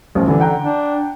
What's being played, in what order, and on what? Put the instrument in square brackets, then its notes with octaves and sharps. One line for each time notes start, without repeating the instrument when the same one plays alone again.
[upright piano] A1 [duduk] F3
[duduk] D3 [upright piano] E3
[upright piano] F#5 G5 A#5
[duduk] D4